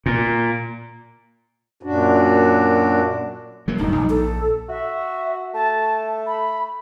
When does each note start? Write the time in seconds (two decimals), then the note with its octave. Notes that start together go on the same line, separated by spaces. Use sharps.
0.06 A#2
1.83 F#2 A#2 D4 F#4
3.68 F#3 A#3
3.79 D1 G2 D#4
3.95 A#1
4.10 A4
4.69 F#4 E5
5.54 A3 A5
6.26 B5